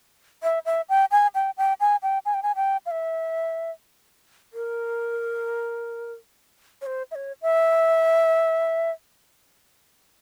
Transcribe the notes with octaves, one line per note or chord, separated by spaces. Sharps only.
E5
E5
G5
G#5
G5
G5
G#5
G5
G#5
G5
G#5
G5
F5
E5
A#4
C#5
C5
E5
C#5
E5